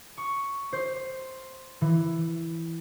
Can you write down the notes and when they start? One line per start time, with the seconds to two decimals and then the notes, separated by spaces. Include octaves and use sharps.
0.17 C#6
0.73 C5
1.81 E3